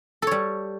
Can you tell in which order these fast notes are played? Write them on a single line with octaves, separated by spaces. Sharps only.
A4 C#5 G3